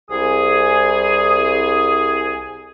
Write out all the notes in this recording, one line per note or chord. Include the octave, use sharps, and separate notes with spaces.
C2 G#4 D#6